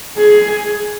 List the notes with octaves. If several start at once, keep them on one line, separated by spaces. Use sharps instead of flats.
G#4